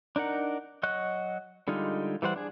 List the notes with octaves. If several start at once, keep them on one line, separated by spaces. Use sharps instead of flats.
D4 D#4 A#4 F#5
F#3 F#4 D#5 F#6
D3 G3 G#3 D#4 F4
E3 G3 C5 F#5
D4 G#4